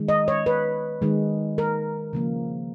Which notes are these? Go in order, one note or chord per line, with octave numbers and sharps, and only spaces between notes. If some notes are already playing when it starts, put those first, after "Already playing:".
Already playing: D#3 G#3
D#5
C#5
B4
D#3 G#3
A#4
C#3 F3 A#3